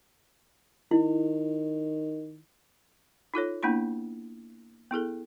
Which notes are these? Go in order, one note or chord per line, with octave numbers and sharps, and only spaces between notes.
D#3 E4
D#4 F4 A4 C#5
A#3 B3 D4 E4 B5
B3 E4 G#4 A4